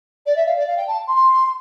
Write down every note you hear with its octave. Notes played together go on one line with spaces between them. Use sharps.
D5
E5
F5
D5
F5
G5
A5
C6